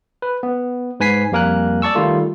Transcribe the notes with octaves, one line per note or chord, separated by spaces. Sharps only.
B4
B3
G#2 B4 G#5 B6 C7
F2 G3 A#3 A#4 G#5 F#6
D5 A5 C#6 E6
D#3 G3 A3 F4 A4